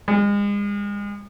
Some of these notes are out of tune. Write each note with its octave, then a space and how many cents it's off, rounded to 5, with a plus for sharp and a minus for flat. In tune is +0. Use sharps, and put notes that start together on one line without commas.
G#3 -35